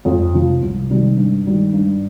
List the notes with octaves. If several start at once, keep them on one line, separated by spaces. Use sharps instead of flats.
F2
C3 F3
C2
C3 D#3 G3
G2
D#3 G3
G2